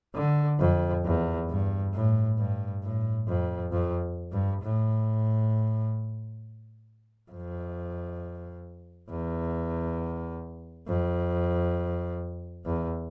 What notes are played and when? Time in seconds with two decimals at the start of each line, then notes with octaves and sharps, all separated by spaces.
0.15 D3
0.59 F2
1.05 E2
1.49 G2
1.94 A2
2.38 G2
2.83 A2
3.28 F2
3.72 F2
4.32 G2
4.62 A2
7.31 F2
9.09 E2
10.88 F2
12.66 E2